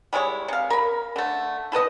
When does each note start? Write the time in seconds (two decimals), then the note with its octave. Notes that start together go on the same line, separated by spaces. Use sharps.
0.13 G3 G#3 E4 C#5
0.48 C3 F5
0.70 A#4 B5
1.16 D3 A3
1.72 E4 A4 B4 D#5